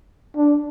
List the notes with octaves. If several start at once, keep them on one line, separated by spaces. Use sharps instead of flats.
D4